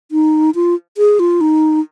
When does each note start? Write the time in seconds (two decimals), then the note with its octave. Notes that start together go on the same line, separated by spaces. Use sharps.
0.11 D#4
0.55 F4
0.97 G#4
1.19 F4
1.41 D#4